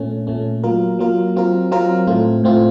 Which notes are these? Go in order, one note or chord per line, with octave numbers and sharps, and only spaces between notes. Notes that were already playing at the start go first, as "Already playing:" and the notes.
Already playing: A#2 A3 C#4
A#2 A3 C#4
F#3 A#3 F4 A#4
F#3 A#3 F4 A#4
F#3 C4 F4 A#4
F#3 C4 F4 A#4
A2 A3 C4 F4
A2 A3 C4 F4